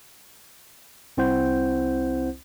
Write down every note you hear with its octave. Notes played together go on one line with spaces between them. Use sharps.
C2 C4 E4 C5 F#5 G6